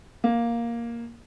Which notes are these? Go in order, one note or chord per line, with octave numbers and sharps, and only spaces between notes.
A#3